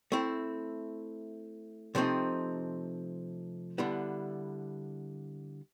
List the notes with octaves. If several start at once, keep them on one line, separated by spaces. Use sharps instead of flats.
A3 C4 E4
C3 F3 A3 C4 D#4
D3 G3 B3 E4